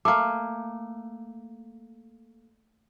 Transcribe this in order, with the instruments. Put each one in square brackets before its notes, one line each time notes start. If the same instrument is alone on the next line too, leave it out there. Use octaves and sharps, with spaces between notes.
[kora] A3 A#3 [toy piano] D6